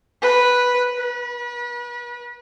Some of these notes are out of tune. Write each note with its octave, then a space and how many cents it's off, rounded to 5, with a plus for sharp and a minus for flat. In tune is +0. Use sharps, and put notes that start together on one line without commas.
B4 -5
B4 -35